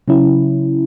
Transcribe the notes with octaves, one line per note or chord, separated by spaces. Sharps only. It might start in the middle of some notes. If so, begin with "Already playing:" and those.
C#3 F#3 C#4 E4